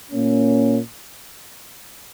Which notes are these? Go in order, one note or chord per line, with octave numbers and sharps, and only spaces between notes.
A#2 A#3 C#4